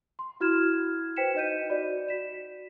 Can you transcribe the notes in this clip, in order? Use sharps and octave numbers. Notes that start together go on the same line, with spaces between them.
C6
E4 F#4 F6 G#6 E7
B4 C5 G5 B6 C#7 E7
D#4 D#5 G6 D#7
F#4 D5
F#4 B6 E7